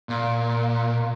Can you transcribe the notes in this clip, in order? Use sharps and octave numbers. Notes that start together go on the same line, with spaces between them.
A#2